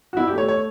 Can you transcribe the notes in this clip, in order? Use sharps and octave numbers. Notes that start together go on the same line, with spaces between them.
F#4
G1 E4
G4
A3
C#5
C#5